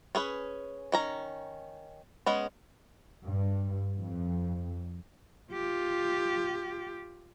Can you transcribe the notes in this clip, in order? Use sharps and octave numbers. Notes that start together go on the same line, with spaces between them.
C#4 G#4 B4
D#3 C#4 A#5
G#3 B3 C#4
G2
F2
F4 G4